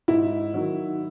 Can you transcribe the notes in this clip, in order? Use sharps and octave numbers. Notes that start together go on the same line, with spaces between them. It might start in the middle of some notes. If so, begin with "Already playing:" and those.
G#2 E4
D#3 F#3